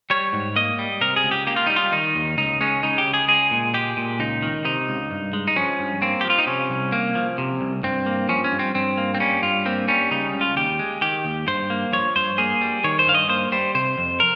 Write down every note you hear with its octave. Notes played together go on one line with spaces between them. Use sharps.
G3 C#5
G#2
A#3 D#5
G3
C3 A#4
G#4
C#2
G4
A#3 G4
F4
G3 D#4
F4
D#3 D#4
D#2
C#2 D#4
G#3 C#4
C#3 D#4
G4
C#2
G#4
G#3 G#4
A#2
G#3 G4
A#2
C#2 D#4
D#3
C3 D#4
C#2
G2
G#3
D#4
F3 C#4
G2
A#3 C4
G4
F3
F4
D#4
C3 C#4
C2
A#3
F3
C3
C2
G2 C4
A#3
F3 C#4
C#4
G2
C4
G2 C4
A#3
C4
G3 C#4
G2 F4
A#3 C4
G3 C#4
C#3 D#4
C#2
F4
D#2 G4
G#3
D#3 G4
D#2
G2 C5
A#3
F3 C#5
G2 C5
A#3 G#4
G3
D#3 C#5
C5
G2 F5
D#5
A#3 C5
G3 C5
C3 C5
F2
A#4